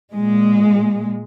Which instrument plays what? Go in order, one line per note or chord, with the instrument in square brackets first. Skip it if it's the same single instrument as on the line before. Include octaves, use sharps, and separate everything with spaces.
[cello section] A#2 G#3